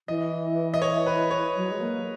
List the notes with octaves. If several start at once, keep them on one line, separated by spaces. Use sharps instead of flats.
E3 D#5
D#5
C#5
B4
C#5
F#3
G#3
A#3